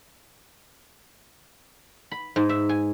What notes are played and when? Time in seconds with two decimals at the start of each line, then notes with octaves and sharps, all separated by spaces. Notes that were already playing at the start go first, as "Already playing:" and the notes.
2.11 B5
2.36 G#2
2.49 E5
2.69 G#5